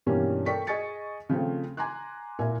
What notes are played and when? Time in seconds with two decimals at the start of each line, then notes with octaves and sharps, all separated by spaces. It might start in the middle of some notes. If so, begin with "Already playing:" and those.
0.06 G2 B2 E3 G3 A#3 C#4
0.46 A4 A#4 D5 G5 C#6 B6
0.67 G#4 D#5 G#5 C#6 A6 C#7
1.29 C#3 F3 A3 C4
1.77 G#5 A#5 C6 D6 F#6
2.39 A#2 E4 A#4 E5 G#5